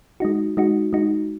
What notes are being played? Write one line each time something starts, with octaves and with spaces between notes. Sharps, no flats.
G#3 D#4 F#4
G#3 D#4 F#4
G#3 D#4 F#4